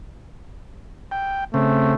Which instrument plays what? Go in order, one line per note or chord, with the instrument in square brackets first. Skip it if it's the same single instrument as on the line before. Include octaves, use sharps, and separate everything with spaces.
[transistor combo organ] G5
[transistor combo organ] C#3 C4 [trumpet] A3